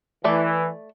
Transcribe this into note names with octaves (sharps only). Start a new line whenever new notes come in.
E3 A3 D5